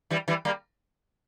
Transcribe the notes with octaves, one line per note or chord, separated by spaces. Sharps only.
E3 G3
E3 G3
G3 A#3